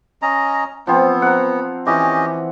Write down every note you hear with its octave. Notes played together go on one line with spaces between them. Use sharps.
C#4 D#5 A#5
F3 B3 C4
F#5 A#5
E3 C#4 G4 D#5